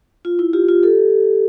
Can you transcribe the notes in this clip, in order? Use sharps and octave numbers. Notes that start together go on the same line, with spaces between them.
F4
E4
F4 G4
F4 G4
G4 A4